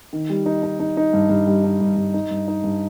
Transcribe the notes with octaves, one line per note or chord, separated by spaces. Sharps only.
D#3
G3
D#4
D#4
D#4
D#4
G2
G2
G3
D#4
G2
G2
D#4
G2
D#4
G2